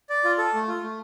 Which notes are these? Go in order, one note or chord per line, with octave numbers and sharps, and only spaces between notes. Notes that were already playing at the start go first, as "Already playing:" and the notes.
D5
F4
A4
A3
F4
A3